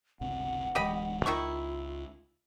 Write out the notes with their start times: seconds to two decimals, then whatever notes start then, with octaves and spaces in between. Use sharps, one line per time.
0.21 G1 C#2 C3 F#5
0.75 D1 E3 G#3 G4 D#5 B5
1.26 C#2 D#3 E4 F4 C#6